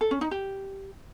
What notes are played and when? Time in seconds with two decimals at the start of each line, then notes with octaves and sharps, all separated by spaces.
0.01 A4
0.11 C#4
0.21 D#4
0.31 G4